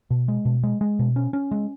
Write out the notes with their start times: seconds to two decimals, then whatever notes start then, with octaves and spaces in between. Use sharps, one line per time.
0.10 B2
0.28 G#3
0.45 B2
0.63 G#3
0.81 G#3
0.99 B2
1.16 C#4
1.33 C#4
1.51 G#3